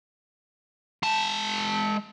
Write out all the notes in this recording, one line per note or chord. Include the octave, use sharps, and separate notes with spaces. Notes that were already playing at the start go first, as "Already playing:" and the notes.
G#3 A5